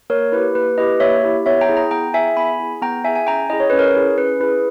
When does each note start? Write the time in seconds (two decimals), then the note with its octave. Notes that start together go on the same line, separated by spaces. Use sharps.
0.10 A#3 A#4 C#5
0.32 E4 B4
0.36 G4
0.55 A#3 B4
0.78 E4 G4 B4 D#5
1.00 A#3 C#5 E5
1.23 E4 G4
1.46 B3 C#5 E5
1.61 G5 A#5
1.69 E4 G#4
1.76 G5 A#5
1.91 B3 G5 A#5
2.14 E4 E5 G#5
2.18 G#4
2.37 B3 G#5 B5
2.59 E4 G#4
2.82 B3 G5 A#5
3.04 E4 E5 G#5
3.08 G#4
3.15 G#5
3.27 C#4 G5 A#5
3.50 E4 G#4 D#5
3.60 C#5
3.70 C#4 B4
3.79 A#4 C#5
3.96 E4 G#4
4.18 C#4 B4
4.40 E4 G#4 B4